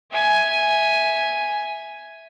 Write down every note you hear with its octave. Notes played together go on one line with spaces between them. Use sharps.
E5 G#5